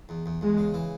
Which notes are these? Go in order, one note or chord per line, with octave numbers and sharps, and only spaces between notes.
E2
E2
E2 G#3
C#3
E3